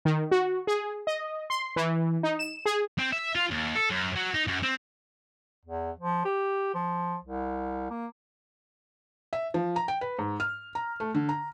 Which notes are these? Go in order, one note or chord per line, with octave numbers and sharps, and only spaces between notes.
D#3
F#4
G#4
D#5
C6
E3
D#4
E7
G#4
C4
E5
F4
D#2
A4
F#2
F#3
D#4
F#2
C4
E2
F3
G4
F3
C2
A#3
E5
F3
A#5
G5
B4
G#2
F6
A#5
A3
D3
A#5